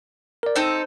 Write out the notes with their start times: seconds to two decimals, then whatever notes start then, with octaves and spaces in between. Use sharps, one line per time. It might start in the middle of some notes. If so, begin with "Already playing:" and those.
0.43 A#4 D5
0.55 C4 D#4 A4 C5